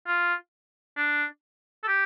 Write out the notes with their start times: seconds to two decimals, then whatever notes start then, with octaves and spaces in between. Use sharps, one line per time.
0.07 F4
0.97 D4
1.84 A4
1.88 G4